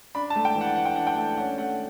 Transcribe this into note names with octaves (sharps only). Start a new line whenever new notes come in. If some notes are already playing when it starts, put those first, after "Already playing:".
D4 B5
A5
A3
G5
E3
F#5
E3 F#5
G5
D4 F#5
G5
A3
C#4 F#5
A3 F#5